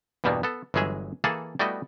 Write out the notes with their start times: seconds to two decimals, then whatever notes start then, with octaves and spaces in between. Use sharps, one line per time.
0.24 E2 G2 B2 G3 A#3 B3
0.43 B3 A4
0.74 G1 E3 F#3 G#3 G#4 E5
1.24 E3 A#3 G#4 A4 F#5 A5
1.59 G3 A3 B3 E4 F#4 D#5